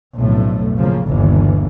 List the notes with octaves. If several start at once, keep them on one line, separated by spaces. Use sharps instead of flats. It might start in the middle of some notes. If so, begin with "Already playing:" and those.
B1 F2 A2 D3 A3
C#3 F3 A#3
G1 D#2 B2 D3 E3